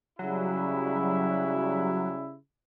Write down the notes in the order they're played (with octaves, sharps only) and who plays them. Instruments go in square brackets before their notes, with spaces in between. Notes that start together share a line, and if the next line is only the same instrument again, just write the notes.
[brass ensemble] C#3 G3 E4 [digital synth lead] F#3